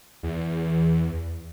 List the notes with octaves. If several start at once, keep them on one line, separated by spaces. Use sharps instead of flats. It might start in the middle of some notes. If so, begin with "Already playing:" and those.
E2